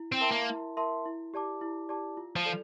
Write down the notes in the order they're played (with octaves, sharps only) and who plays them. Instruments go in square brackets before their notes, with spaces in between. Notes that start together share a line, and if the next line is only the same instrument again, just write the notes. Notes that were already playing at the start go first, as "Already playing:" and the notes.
Already playing: [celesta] E4
[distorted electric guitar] C4
[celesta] A#4 E5 A5 C6
[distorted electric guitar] A#3
[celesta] E4
A#4 E5 A5 C6
E4
G4 D5 A5 D6
E4
G4 D5 A5 D6
F4
[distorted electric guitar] F3
[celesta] A4 D5